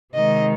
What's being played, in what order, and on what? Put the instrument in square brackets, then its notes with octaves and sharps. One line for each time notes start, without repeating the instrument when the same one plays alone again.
[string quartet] C3 D#3 G#3 [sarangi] D#5